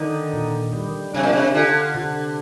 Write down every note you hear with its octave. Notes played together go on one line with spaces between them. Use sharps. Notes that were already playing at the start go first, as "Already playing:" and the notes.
Already playing: D3 D#3 D#4
A#2
G3
C3 D4
A#2
C3
D3 F4
C3